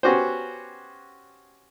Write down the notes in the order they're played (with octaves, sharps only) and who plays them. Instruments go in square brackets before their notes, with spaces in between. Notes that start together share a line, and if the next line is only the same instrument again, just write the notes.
[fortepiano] B3 C#4 F#4 G4 C5